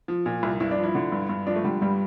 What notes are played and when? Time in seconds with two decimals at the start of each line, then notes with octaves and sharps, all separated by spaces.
0.08 F3
0.26 A#2
0.43 C2
0.60 G2 E4
0.71 D4
0.77 F3
0.83 E4
0.95 D3
1.12 G2
1.29 G2
1.46 F3 D4
1.55 A3
1.64 D3 G3
1.82 G2 G3